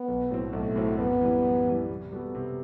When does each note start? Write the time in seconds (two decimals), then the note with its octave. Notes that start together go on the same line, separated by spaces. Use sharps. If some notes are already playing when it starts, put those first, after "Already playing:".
Already playing: B3
0.08 B1
0.31 A2 F#3 C4
0.53 B1 A3
0.76 A2 F#3 C4
0.98 F#2 B3
1.21 E3 G3
1.44 F#2
1.67 E3 G3
1.89 C3
2.12 G3 B3 F#4 A4
2.35 C3